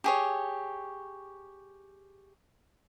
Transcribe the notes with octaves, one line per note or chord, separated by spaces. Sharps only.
G4 G#4 C#5